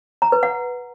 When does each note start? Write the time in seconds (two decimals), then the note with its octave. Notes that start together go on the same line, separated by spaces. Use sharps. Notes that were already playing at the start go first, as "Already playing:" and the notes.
0.22 A#5
0.32 B4
0.43 F#5